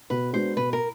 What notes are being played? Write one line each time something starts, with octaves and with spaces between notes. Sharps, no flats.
B2 B4
G#3 B3 D4 F#4 C5
B2 B4
A#4